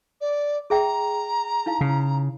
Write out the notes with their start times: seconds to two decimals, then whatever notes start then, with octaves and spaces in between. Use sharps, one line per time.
0.21 D5
0.70 G#4 E5 G5 A#5
1.66 D#4 E4 F5
1.81 C#3 F5